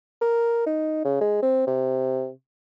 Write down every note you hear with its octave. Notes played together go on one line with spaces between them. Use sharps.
A#4
D#4
C#3
G#3
C4
C3